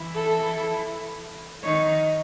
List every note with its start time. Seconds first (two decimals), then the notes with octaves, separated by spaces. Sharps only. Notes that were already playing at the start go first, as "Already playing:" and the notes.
Already playing: E3 E4
0.15 A4
1.63 D#3 D#4 C#5